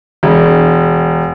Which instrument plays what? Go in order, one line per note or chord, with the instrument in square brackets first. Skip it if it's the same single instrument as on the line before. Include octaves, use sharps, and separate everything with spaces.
[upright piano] E1